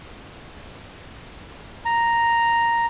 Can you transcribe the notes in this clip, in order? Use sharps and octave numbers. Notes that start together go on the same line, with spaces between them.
A#5